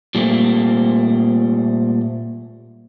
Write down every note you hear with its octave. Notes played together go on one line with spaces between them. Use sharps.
A#2 G3 A3 A#3 C4